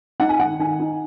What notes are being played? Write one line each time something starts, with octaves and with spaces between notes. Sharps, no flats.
D#4 F#5
G#5
D#3 F#5
D#3 G#5
D#4